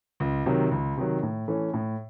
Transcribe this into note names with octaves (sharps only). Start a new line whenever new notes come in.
C#2
C3 D#3 F#3
C#2
C3 D#3 F#3
A2
E3 A3 C#4
A2